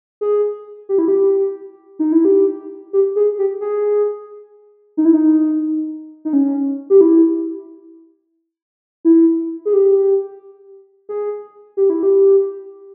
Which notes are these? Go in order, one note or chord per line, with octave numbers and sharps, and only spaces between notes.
G#4
G4
E4
G4
D#4
E4
G4
G4
G#4
G4
G#4
D#4
E4
D#4
D#4
C#4
G4
E4
E4
G#4
G4
G#4
G4
E4
G4